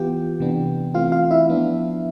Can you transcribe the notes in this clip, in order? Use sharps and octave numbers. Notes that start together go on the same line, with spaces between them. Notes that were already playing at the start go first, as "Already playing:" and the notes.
Already playing: E3 B3 F4 G4 G5
C3 E3 B3 D4
E3 A3 C4 F4 F5
F4 F5
E4 E5
F3 B3 D4